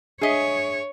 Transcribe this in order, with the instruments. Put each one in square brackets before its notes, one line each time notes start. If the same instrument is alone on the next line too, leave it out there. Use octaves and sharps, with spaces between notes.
[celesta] D4 E5 B6 [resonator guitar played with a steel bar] G#4 D#5 [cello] C#5